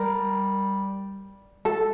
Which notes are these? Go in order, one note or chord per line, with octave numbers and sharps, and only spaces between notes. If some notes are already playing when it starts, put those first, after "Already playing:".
Already playing: G3 A#4
A4